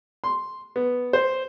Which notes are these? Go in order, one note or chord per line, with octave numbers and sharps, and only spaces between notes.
C6
B3
C5